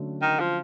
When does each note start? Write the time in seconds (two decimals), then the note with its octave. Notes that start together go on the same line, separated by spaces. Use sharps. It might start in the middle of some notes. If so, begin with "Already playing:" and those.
Already playing: D3 F#3 A3 C#4
0.22 D#3
0.40 F3